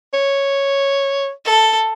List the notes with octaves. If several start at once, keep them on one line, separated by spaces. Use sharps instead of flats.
C#5
A4